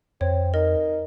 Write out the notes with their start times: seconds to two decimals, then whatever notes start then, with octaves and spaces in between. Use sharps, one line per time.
0.21 F2 C4 C#5
0.54 D#4 A#4 D#5